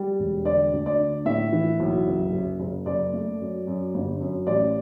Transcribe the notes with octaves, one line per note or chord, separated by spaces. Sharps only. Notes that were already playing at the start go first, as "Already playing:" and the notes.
Already playing: G3
E1
D3 D5
D2
D5
D3
A2 E5
E3
B1
F#1
F#1
F#1
F#1 D5
A3
F#2
F#2
G1
F#2
A1 D5